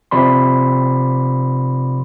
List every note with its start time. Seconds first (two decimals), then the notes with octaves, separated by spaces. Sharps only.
0.11 C3 F3 D5 B5 C6